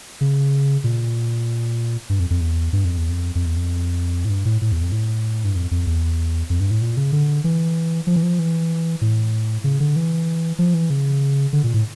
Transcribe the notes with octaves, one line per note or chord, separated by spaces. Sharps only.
C#3
A#2
G2
F2
F2
E2
G2
F2
E2
F2
F2
E2
F2
A2
G2
A2
A2
E2
F2
A2
G2
F2
F2
E2
F2
G2
A2
A#2
C#3
D3
E3
F3
E3
F3
E3
A2
C#3
D3
E3
F3
E3
C#3
D3
A#2
A2